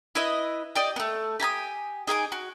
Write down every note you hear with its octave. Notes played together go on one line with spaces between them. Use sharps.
E4 B4 D#5
G4 D5 D#5
A3 B3
G4 G#5 A#5 D#6
D#4 G#4 G#5 D6
F#4